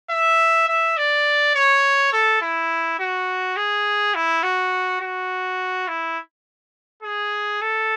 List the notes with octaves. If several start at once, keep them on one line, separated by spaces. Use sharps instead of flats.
E5
E5
D5
C#5
A4
E4
F#4
G#4
E4
F#4
F#4
E4
G#4
A4